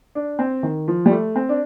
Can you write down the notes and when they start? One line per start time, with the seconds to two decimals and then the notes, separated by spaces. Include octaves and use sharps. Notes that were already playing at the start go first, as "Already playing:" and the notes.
0.15 D4
0.39 C4
0.63 D#3
0.88 F3
1.06 G3
1.11 A3
1.36 C4
1.49 D4